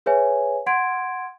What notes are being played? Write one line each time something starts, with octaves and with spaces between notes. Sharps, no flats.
G#4 B4 C#5 E5 G#5
F#5 C6 G#6 D7